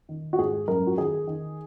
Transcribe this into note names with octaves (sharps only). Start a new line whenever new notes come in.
D#3
F#4
G#2 G#4
F#2 A#4
F#4
D#3 G#4
D#3